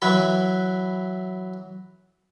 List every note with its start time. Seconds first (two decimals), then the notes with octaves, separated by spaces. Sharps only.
0.02 E3 F#3 B4 B5